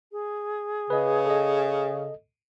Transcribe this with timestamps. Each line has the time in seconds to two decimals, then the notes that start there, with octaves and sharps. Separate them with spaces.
0.12 G#4
0.90 C#3 B4 D#5
1.26 A4 D#5